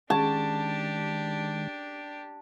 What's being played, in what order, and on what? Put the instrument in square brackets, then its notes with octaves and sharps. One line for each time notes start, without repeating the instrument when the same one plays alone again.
[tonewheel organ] D#3 G#3 [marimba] C#4 G#4 [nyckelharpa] D4 G4 [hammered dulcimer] A5